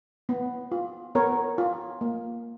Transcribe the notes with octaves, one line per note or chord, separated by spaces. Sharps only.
B3
F4
B3 A#4 C#5
F4
A#3